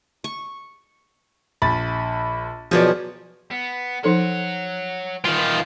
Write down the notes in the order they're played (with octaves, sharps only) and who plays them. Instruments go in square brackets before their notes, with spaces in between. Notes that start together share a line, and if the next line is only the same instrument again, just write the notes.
[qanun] C#6
[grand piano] A#1 B5 A6
[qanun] B2 F#3 G#4 [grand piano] F3 D5
[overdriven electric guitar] B3
[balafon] F3 D#4 A4 [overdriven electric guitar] C#5 F#5
[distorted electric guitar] D#3 F4 [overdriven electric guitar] E3